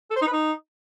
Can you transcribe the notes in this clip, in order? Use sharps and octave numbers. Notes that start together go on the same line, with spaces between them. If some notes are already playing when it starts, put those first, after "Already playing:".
A4
C5
D#4
B4
D#4